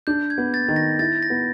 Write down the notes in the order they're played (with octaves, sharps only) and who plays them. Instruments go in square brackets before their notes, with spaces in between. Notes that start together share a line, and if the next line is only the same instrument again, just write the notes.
[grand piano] D4 [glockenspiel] G6
[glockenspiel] G#6
[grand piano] B3
[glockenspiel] A6
[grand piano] D#3
[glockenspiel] A#6
[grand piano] E4 [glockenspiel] A6
[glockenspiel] A#6
[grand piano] B3